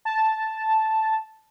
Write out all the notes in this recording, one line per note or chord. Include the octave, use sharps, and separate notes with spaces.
A5